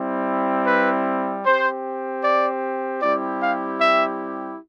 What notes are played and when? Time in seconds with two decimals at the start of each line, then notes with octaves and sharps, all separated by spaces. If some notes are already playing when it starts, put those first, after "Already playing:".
Already playing: G3 C4 E4
0.65 B4
1.44 C4 G4 C5
2.22 D5
3.01 G3 C4 E4 G4 D5
3.40 F5
3.79 E5